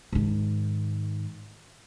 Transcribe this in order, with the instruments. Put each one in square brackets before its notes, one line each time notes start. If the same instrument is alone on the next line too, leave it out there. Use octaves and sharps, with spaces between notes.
[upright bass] G#2 D#3